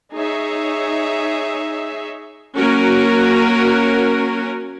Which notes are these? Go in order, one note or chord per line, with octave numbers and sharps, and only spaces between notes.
D#4 G#4 C#5 E5
F#3 A#3 C#4 F#4 A#4